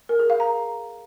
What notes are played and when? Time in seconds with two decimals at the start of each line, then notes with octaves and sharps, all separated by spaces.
0.09 A#4
0.19 G#4
0.30 F5
0.40 A#5